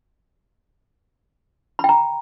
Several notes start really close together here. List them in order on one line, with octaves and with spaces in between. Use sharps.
B5 G5 A#5